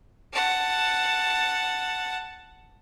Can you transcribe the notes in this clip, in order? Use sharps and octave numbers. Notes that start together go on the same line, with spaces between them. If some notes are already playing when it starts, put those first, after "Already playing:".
F#5 A5